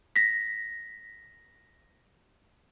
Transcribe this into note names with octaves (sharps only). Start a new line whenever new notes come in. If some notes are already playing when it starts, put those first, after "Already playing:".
A#6 B6